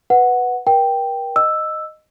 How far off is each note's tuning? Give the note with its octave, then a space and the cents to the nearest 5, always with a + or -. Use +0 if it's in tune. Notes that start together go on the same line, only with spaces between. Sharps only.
B4 +0 F#5 -5
A#4 +40 G5 +0
D#5 -10 E6 +0